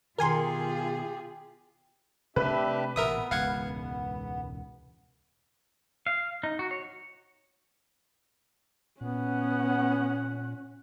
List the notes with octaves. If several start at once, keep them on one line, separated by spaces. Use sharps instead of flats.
B2 D#3 F4 G4 G#4 A#4 G#5 C6
C3 A3 D4 G4 B4 E5
A1 A#2 B3 A#4 E5 D#6
E1 C#2 G#2 F5 F#5 G#6
F5
D#4
F#4
C#5
A#2 B3 C#4 F#5